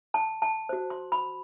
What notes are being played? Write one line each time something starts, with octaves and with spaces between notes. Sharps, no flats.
A5
A5
F#4 C5
C6
B5